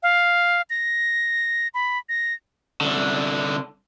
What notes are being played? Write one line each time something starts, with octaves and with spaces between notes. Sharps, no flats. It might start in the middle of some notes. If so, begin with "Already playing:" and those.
F5
A#6
B5
A#6
C2 D3